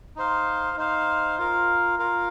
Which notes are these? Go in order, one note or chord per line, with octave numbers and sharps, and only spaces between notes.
D#4 C5 F5
D#4 C5 F5
F4 A#4 F5
F4 A#4 F5